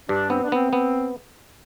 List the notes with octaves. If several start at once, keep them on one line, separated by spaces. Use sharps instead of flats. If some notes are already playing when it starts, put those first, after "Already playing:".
G2 D4
B3 C4
D4
B3 C4
B3